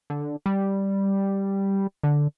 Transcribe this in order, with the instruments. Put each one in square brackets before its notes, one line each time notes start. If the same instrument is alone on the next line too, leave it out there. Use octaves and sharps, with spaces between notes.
[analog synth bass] D3
G3
D3